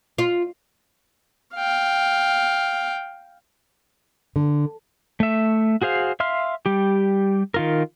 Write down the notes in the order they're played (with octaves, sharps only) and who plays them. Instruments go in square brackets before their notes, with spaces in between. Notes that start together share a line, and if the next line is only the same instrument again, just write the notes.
[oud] F4
[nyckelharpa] F5 G5
[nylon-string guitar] D3
[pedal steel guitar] A3 E5
F#4 G#4 C5 F5
E5 F5 C6 F6
G3 G4
D#3 F4 A#4